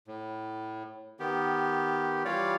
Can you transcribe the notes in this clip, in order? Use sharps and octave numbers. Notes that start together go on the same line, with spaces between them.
A2
D#3 B3 G4
E3 G3 F4 C#5 D5